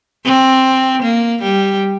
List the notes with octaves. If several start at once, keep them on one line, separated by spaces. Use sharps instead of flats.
C4
A#3
G3